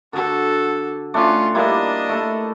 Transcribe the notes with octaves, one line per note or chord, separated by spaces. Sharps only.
D3 F#4 A4
A3 C#4 D4 F4
G3 A#3 D4 E4 D#5
A3 A4